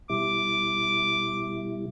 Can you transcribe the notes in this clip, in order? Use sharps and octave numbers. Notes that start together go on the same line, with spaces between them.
B2 G3 E4 D6